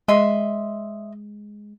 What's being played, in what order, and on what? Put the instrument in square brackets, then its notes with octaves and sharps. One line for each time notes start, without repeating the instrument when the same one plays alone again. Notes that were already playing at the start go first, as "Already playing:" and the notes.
[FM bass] G#3 [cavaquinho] D#5 E5 C6